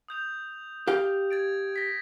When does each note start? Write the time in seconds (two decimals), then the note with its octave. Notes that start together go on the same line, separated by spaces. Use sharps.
0.08 D#6 G6 F7
0.87 G4 F5 G5
1.30 G#6 A6 D7
1.76 A#6 B6